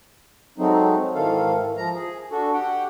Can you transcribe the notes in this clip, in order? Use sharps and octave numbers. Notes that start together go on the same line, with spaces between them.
F#3 G#3 A3 C4 D#4
G#2 D#3 E3 A4 F5
F3 A#5
G#4
D4 F#4 A4
G4 F#5 G5